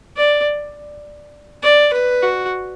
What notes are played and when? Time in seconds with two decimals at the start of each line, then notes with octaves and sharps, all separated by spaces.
0.16 D5
1.63 D5
1.93 B4
2.23 F#4